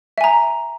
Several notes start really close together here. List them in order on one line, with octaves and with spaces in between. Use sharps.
E5 G#5 A#5